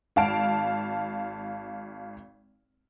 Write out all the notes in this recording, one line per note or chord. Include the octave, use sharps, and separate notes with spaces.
G#1 F5 A5 D7